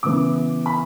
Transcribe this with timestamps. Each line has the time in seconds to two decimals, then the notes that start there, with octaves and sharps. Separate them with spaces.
0.03 C#3 E3 B3 D6
0.66 B5